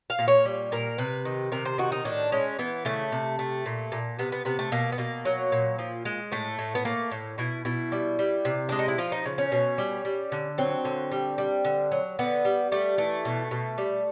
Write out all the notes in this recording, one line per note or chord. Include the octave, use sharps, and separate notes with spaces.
F5
A#2
C#5
G3
A#2 A#4
C3 B4
D#3
C3 A#4
C5
D#3 F#4
D#4
A2 D4
G#3 C#4
E3 B3
C#3 A3
C3
A3
A#2
A#2
C3 B3
B3
C3 B3
A3
B2 A#3
B3
B2 A#3
F#3
A#2
F3
G#3
A2 A3
A2
B3
A3 A#3
A2
B2 E4
B2 E4
G3
G3
C3
G#3 D4
D#4
E4
F3 F4
D#4
C#3
C#4
B2
G3
G3
D3
F#3 C4
D3
G3
G3
D3
F#3
D3 B3
G3
G3 A3
E3 A3
B2
B2
G3